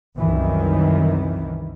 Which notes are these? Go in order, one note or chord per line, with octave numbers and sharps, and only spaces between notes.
C2 F#2 D#3 E3